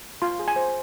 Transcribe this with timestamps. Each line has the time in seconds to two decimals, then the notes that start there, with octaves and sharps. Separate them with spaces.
0.22 F4 C6
0.39 G#4
0.48 G#5
0.56 C5